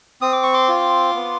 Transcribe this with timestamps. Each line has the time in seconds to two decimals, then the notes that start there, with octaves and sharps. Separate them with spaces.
0.21 C4 D#6
0.33 D6
0.43 C#6
0.54 C6 D6
0.69 F4
1.15 B3